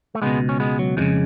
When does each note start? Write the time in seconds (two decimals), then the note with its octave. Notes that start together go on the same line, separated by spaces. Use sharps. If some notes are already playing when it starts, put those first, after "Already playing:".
0.15 A3
0.22 C#2 B2 G#3 B3
0.49 C#4
0.60 G#3 B3
0.79 F#3
0.97 F2 F3 G#3
1.01 C#3